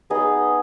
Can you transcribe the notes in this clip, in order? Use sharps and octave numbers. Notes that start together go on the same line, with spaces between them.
B3 D#4 G#4 B4